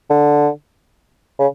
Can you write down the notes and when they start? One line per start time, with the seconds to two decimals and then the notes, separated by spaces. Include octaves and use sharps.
0.10 D3
1.39 C#3